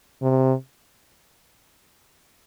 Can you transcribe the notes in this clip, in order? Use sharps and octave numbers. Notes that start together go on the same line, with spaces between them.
C3